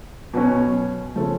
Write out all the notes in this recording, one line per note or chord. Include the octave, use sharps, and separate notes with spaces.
B2 F#3 C#4
C#3 F3 A3 C#4